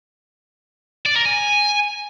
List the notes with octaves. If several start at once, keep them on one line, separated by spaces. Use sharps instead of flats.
D5
A#4
G#5